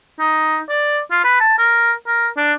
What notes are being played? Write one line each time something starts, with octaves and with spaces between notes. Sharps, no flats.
D#4
D5
F4
B4
A5
A#4
A#4
D4